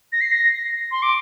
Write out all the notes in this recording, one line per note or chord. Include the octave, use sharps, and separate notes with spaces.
A#6
C7
A#6
C6
D6